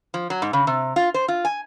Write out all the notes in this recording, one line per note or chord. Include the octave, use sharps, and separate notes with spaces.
F3
F#3
G#2
C#3
C3
F4
C5
F4
G#5